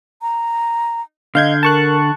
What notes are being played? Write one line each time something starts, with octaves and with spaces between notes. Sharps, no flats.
A#5
D3 D#5 F5 G6 G#6
A#4 A5 C#6 F#6